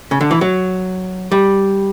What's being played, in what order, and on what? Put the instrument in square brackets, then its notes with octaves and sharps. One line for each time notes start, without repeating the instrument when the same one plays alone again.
[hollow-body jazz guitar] C#3
D3
E3
F#3
G3